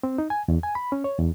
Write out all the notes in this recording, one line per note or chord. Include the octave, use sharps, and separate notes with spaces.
C4
D#4
G#5
E2
G#5
B5
C#4
C#5
E2